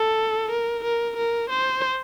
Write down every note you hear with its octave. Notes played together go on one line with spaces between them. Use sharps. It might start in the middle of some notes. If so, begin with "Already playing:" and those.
Already playing: A4
A#4
A#4
A#4
C5